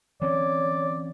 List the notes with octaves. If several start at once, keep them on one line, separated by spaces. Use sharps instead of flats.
E3 C4 C#4 C#5 D5